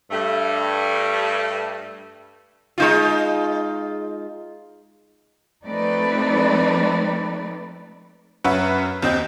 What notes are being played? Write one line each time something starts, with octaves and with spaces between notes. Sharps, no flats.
G2 A3
G#3 D#4 F4
F3 A3 C4 D#4 B4 D5
F#2 C#4 B4 E5 F#5
D#2 C4 D#5 G6